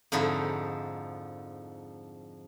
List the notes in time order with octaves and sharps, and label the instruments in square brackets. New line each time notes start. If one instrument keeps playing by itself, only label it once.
[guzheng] F2 G#2 D3 F3 D#4 E4